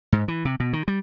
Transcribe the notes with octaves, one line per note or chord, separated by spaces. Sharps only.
G#2
E3
C3
B2
D#3
G3